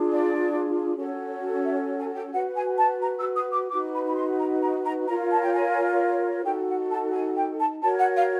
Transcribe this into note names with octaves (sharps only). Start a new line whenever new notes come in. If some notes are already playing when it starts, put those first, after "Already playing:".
Already playing: D4 F4 G#4
D5
C#4 F#4 A4 C#5
E5
G#5
G5
F#4 B4 F#5
G#5
A5
A#5
E6
D#6
D6
D#4 F#4 B4 D6
B5
B5
C6
A#5
A#5
A#5
F4 A#4 C#5 A#5
A5
G5
G#5
D#4 F#4 A4 G5
F#5
A5
G#5
G5
A5
F#4 A#4 C#5 A5
F#5
F5